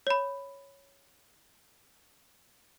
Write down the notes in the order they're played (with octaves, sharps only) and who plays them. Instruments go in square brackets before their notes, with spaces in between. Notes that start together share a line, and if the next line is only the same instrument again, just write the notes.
[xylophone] C#5 B5